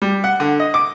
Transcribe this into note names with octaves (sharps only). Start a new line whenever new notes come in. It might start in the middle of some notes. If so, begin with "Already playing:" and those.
G3
F#5
D3
D#5
D6